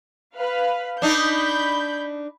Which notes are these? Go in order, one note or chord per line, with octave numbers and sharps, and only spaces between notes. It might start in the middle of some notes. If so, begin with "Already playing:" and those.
B4 F5
D4 D#4 B5 G6